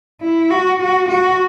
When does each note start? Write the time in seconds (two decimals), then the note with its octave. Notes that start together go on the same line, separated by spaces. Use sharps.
0.21 E4
0.51 F#4
0.80 F#4
1.09 F#4